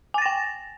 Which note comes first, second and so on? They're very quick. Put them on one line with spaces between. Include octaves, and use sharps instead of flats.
G#5 A6 A#6 G5